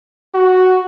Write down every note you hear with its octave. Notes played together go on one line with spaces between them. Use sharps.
F#4